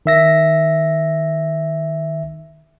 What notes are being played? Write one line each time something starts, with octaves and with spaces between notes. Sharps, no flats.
D#3 E5 A#6